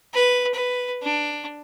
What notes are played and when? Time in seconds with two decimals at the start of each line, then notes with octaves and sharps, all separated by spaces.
0.14 B4
0.54 B4
1.03 D4